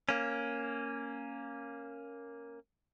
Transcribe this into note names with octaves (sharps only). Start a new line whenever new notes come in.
A#3 C#4